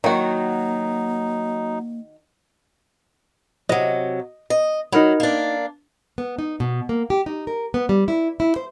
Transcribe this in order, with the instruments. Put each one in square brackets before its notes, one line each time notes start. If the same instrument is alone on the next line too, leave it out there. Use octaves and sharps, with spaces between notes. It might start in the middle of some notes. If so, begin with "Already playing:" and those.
[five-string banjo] D#3 F#4 [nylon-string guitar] F#3 [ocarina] A#3 [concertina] D#4
[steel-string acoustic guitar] C3 F#3 [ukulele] D#5
[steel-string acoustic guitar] D#5
[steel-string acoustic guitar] F#3 [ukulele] D#4 A#4 B5
[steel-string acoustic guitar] A#3 D4
[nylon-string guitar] B3
D#4
B2
A#3
G4
D#4
A#4
B3
G3
E4
E4
C5